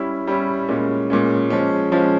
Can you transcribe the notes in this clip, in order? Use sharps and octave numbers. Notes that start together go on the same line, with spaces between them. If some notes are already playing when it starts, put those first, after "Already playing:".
Already playing: G3 C#4 E4
G3 C#4 E4
A#2 G#3 C#4
A#2 G#3 C#4
F3 G#3 C#4
F3 G#3 C#4